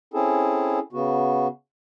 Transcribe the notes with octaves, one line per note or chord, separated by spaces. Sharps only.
C4 C#4 E4 G#4 A4
C#3 B3 F#4